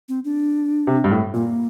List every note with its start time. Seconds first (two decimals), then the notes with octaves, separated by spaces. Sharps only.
0.09 C4
0.25 D4
0.87 C3
1.04 G2
1.11 A2
1.34 A#2 A#3